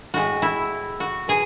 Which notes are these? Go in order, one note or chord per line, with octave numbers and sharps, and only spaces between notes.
A2 G#3 F#4
E4
F#4
B2 G#4